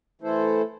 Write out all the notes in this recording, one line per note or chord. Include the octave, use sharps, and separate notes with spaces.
E3 A3 E4 A4 C5